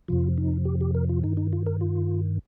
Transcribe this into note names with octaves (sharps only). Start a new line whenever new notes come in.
F2 C3 F3 F4
D#4
G4
G4
A#4
F4
G2 D#3 D#4
D#4
F4
A#4
F4